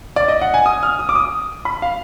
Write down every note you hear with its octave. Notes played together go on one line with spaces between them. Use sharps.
D5
D#5
F#5
G#5
D#6
F6
D#6
D6
D#6
B5
F5